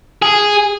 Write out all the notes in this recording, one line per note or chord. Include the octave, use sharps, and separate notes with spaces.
G#4